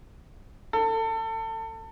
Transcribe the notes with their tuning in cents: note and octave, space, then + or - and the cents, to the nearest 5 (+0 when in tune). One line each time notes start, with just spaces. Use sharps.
A4 +30